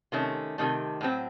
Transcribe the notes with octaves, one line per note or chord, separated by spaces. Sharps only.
C3 D#3 A3 C#4
C3 D#3 A3
A2 F#3 C4